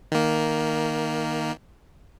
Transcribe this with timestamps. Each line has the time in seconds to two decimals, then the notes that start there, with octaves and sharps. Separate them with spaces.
0.12 D#3 A#3